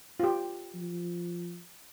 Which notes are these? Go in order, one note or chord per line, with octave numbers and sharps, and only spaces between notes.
F4 G4
F3